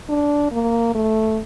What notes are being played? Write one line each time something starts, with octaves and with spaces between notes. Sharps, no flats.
D4
A#3
A3